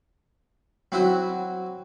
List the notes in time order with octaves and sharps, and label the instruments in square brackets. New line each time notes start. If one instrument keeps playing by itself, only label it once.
[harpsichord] F#3 C4 E4 F#4 E5